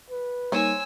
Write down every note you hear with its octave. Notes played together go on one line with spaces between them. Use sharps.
B4
G3 A#3 D#4 C5 C#5 G#5 E6